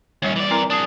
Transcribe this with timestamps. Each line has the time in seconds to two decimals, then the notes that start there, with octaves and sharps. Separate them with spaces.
0.22 D#2 G3 C#4 C#5
0.36 E3 D5
0.51 C4 E4 A#4 A#5
0.70 D4 G#4 A5 D#6